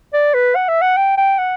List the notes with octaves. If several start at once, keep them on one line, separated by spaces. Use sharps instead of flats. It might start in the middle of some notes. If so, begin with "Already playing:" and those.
D5
B4
F#5
E5
F#5
G5
G5
F#5